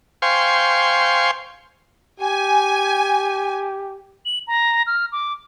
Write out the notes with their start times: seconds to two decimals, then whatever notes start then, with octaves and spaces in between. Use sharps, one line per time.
0.22 C5 F5 G5 G#5 C6 C#6
2.20 G4 G#5
4.25 F#7
4.47 A#5
4.87 F6
5.12 D6